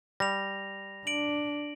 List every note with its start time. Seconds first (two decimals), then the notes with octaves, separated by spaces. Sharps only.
0.20 G3 A#6 F7
1.07 D4 D7 F#7